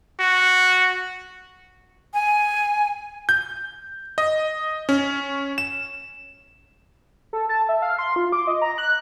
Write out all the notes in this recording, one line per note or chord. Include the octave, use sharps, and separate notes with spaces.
F#4
G#5
G6
D#5
C#4
E7
A4
A5
E5
F5
C6
F4
D6
D#5
A#5
F#6